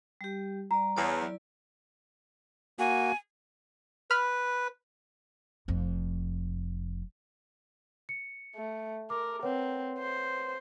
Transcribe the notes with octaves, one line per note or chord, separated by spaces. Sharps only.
G3 G4
G3 D5 A#5
E2 C#5 A5 D#6
F#3 E4 D5
A#3 F#4 G#5
B4 B5 F6
F1 F2
C#7
A3
A#4 D6
C4 B4 C#5 F#5
C5